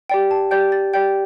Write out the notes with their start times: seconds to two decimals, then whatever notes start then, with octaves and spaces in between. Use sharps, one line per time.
0.10 G4 D5 G5
0.31 A5
0.51 G4 D5 G5 G6
0.72 A6
0.93 G4 D5 G5 G6